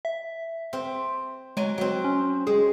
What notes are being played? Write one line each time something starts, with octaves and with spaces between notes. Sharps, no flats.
E5
C4
F#3 G#3 G#5
F#3 C4
C#4
G#3 G#4